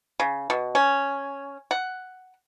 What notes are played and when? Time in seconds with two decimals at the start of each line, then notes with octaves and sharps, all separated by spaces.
0.20 C#3
0.50 B2
0.75 C#4
1.71 F#5